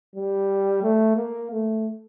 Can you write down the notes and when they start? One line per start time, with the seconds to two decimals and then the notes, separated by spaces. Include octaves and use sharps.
0.15 G3
0.83 A3
1.16 A#3
1.51 A3